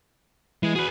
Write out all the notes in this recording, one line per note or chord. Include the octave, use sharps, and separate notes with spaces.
E3 G#3 E4
F#4 G#4 B4